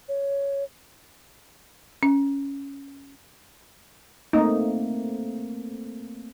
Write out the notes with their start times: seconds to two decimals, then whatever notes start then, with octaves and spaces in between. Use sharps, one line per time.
0.09 C#5
2.03 C#4
4.33 A3 A#3 C4 D#4